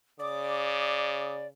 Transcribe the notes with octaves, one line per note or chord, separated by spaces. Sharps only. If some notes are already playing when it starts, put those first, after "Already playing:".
C#3 D5 D6 D#6